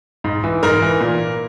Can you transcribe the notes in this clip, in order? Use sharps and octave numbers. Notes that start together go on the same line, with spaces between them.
G#2
E3
G#2 A#4
E3
A#2